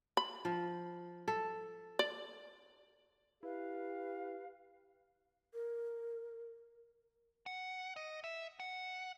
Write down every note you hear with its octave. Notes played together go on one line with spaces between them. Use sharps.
B5
F3
A4
D5
E4 G4 B4 F5
A#4
F#5
D#5
E5
F#5